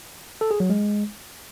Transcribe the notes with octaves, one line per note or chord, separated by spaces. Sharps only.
A4
G#4
F#3
G#3